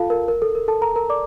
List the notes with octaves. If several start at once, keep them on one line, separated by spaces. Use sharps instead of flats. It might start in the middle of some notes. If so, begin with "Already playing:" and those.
Already playing: F4 A4 F5 A5
A#4
A#4
A4
A#4
A4 A5
A#4 A#5
A#4 A#5
D5 D6